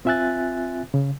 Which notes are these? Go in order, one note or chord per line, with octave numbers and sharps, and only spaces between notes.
C4 F4 E5 G#5 F#6 A6
C#3